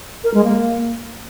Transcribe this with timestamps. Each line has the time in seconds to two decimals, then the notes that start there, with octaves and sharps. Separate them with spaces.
0.24 A#4
0.34 G#3
0.44 A#3